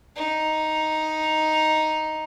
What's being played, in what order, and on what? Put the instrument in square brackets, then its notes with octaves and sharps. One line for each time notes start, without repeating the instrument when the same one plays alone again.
[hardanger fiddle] D#4